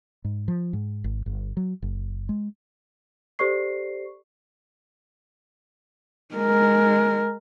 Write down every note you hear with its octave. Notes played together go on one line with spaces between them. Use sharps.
G#2
F3
G#2
G#1
G1
F#3
F#1
G#3
G4 A4 C5 D5 C#6 C7
G#3 A#4